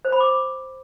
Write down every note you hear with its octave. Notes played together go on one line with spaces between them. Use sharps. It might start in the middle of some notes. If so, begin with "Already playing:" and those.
C5
B5
D6